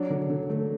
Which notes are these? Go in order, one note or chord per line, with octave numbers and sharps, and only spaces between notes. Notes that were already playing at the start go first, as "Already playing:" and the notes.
Already playing: F#3 D4 C#5
D3
D3
A3